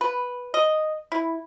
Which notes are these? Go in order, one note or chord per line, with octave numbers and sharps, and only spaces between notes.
B4
D#5
E4